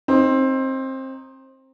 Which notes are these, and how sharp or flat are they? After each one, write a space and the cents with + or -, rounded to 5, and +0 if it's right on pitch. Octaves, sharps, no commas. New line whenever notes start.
C4 +20 D#4 +0